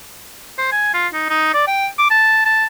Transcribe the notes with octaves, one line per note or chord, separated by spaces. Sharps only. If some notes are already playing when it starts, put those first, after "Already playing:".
C5
G#5
F4
D#4
D#4
D5
G5
D6
A5
A5